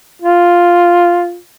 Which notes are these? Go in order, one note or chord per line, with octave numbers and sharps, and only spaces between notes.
F4